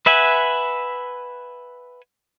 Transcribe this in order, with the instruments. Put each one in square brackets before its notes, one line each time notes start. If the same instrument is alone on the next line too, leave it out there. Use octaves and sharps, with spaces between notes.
[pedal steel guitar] B4 E5 F#5 G#5